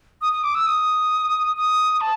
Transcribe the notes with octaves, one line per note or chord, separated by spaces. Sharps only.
D#6
D#6
D6
E6
D#6
D#6
A5